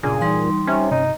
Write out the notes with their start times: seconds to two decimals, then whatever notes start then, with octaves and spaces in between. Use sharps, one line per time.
0.03 G1 A#2 C#3 D4 G#4
0.21 E3 G3 D#4 C6
0.67 C3 C#4
0.91 G2 C3 D#4